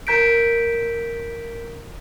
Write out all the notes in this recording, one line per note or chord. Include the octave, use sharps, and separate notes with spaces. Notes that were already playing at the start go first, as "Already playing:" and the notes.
A#4 A#5 G6 B6 D7